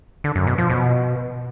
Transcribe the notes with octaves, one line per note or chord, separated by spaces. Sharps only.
D3
F#2
B2
F3
B2